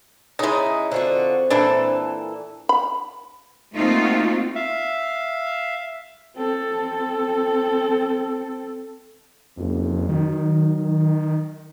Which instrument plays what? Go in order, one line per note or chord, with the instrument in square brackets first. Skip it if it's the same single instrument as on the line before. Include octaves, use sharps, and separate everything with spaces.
[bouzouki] C#3 E4 [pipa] G#3 D#4
[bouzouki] D3 F4 F#4 [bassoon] C4
[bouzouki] A#2 E3 A4 [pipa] D4 E4
[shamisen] B5
[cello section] A3 A#3 C4 D#4 F4 F#4
[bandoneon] E5 F5
[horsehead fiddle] C4 A4
[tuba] F#1 [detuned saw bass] F2
[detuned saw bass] D#3 [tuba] F#3